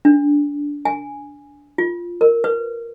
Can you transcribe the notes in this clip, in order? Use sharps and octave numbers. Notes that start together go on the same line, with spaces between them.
D4
G#5
F4
A#4
B4